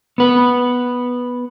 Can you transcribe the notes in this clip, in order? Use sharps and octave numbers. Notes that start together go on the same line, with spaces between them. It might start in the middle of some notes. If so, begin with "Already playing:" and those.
B3 B4